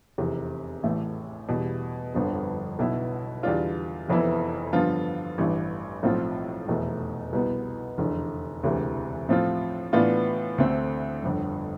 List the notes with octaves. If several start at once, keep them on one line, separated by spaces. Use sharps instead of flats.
F1 E2 C3
A1 A2 E3 A3
E2 B2 G3
G1 F2 D3 F3 B3
B1 B2 B3 E4
E2 D3 G3 D4 F4
F1 F2 E3 B3 E4
G2 D3 F3 B3 F4
A1 G2 E3
B1 A2 F3 C4 F4
F1 E2 B2 A3
C2 B2 B3
F1 E2 D3
E1 D2 C3 E3
A2 F3 C4 F4
A2 E3 B3 D4 F4
D2 D3 A3 C4
G1 F2 D3